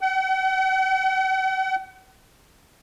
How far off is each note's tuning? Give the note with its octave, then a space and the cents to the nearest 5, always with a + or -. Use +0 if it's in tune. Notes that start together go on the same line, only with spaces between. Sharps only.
F#5 +45